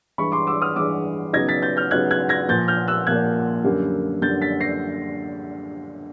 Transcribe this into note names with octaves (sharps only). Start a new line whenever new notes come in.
G2 E3 G#3 B5 C#6
C6 D6
D6 E6
D#6 F6
G2 E3 G#3 D6 E6
C#3 F#3 B3 D#4 G#6 A#6
A6 B6
G6 A6
F6 G6
C#3 F#3 B3 D#4 F#6 G#6
F#6 G#6
G#6 A#6
A#2 F3 A#3 G6 A6
F6 G6
E6 F#6
A#2 F3 A#3 F#6 G#6
F#2 D3 G3 A#3
F#2 D3 G3 A#3 G6 A6
A6 B6
A#6 C7